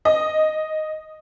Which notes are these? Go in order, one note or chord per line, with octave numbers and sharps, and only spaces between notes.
D#5